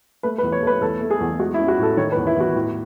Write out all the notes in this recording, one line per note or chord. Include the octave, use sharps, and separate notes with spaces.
A3 B4
B4
E2
C#5
A3 B4
E2 A4
A3
G#4
E2
G#3 F#4
E4
C#4
F#4
A2 A4
D#3 C#5
B4
E2
E4
E2 F#4
A2